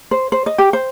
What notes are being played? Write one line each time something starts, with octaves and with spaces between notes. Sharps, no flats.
C5
C5
D#5
G4
C5